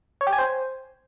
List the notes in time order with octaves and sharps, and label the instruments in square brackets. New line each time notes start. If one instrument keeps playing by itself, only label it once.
[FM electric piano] C#5
G4
G#5
C5